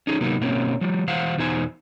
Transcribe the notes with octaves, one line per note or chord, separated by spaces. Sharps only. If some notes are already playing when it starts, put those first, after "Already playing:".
C#4 D#4 G#4
C3 F#3 A#3 B3 D#4
B2 A#3 C4 C#4
F3 G3
E3 C5 F5 F#5
E2 B2 D#4 C5 G#5